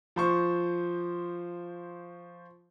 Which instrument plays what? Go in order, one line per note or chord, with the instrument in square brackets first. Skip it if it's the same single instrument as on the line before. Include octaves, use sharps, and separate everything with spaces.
[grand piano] F3 C5 C#6